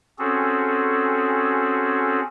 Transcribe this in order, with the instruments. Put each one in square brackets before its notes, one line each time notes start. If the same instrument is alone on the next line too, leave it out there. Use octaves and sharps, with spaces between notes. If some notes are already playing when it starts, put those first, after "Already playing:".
[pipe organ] C4 C#4 F#4 G#4 A4